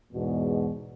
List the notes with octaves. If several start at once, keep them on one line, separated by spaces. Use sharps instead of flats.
E2 G#2 B2